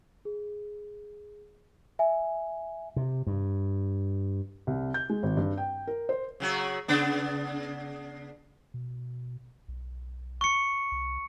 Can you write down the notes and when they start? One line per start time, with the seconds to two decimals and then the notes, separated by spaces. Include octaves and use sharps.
0.25 G#4
1.99 E5 G#5
2.96 C3
3.27 G2
4.67 C2
4.94 G6
5.10 G#3
5.23 G#1
5.37 G2
5.57 G5
5.87 A#4
6.09 C5
6.40 C#3 F#3 F#4
6.88 C#3 B3 D4
8.74 B2
9.68 B1
10.41 C#6 C#7
10.92 C2